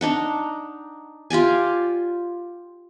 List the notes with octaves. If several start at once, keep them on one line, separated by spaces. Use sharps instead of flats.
D4 D#4 F#5
F4 G4 D5 G#5